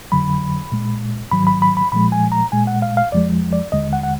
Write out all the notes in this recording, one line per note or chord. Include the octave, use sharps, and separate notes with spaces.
F2 D3 F#3 B5
A#2 G#3
G#2 D#3 F#3 B5
B5
B5
B5
A#2 F3 G#3 B5
G#5
A#5
A#2 G#3 G#5
F#5
F5
F5
F2 F3 G#3 D5
D5
D#2 D3 G#3 D#5
F#5
F#5